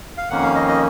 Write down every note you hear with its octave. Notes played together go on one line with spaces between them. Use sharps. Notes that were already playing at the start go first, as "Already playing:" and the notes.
F5
F2 D#3 A#3 C#4 F#5
F5
D#5
D#5